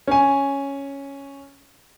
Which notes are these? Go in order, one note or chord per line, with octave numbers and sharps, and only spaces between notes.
C#4 G#5